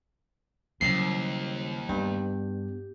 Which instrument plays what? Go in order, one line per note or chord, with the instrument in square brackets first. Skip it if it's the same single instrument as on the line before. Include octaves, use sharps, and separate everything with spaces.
[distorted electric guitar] D#2 [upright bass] C#3 F#3 [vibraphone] G3 E4 C5 [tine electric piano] C7
[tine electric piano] G2 [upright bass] B3 [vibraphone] G4